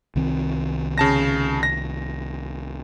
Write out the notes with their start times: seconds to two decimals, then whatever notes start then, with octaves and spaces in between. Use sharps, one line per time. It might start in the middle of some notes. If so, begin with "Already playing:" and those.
0.16 C2 D#3 C4
0.98 C#3 A5 A#6
1.63 A#6